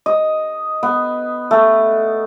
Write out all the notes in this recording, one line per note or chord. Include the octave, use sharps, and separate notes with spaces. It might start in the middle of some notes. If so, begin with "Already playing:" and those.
D#5
B3
A3